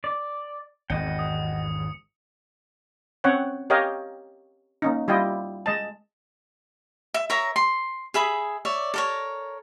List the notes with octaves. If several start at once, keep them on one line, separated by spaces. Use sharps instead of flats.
D5
G#1 E2 F#4 D#5 G5 C#7
D#6
C4 C#4 C#5 F#5 G5
G4 A#4 C#5 D#5 F5 G5
A#3 C#4 D#4
G3 E4 F4 D#5 G5
G#3 D#5 A5
E5
A#4 C#5 E5 A#5
C6
G#4 E5 B5 D#6
C#5 D5 E5
A4 A#4 C#5